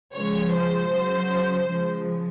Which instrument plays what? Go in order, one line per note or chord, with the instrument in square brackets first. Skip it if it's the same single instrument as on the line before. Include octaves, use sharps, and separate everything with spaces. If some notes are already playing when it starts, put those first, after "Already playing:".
[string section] C#3 F3 G#3 C#5
C5
C#3 F#3
C#3 F3 G#3